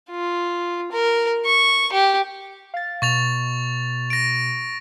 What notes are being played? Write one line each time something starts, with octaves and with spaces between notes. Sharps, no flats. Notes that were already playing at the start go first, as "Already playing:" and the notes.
F4
A#4
C#6
G4
F5 A6
B2 C#6 A6 F7
A#6 D7